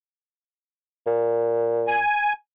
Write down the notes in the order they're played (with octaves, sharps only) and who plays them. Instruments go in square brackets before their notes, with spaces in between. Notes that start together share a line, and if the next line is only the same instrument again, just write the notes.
[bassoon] A#2
[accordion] G#5